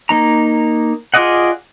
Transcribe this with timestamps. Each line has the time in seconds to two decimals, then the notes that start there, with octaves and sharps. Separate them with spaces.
0.09 A#3 D#4 A#5
1.14 F4 G#4 D5 D#5 F#5